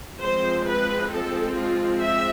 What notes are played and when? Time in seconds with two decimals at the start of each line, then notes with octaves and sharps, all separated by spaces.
0.20 F3 G#3 C4 C5
0.66 B4
1.10 A4
1.56 F4
2.01 E5